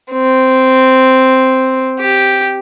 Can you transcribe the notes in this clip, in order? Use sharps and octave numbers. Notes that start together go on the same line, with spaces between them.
C4
G4